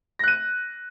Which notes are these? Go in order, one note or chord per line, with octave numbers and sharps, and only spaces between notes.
F#6 A#6 D#7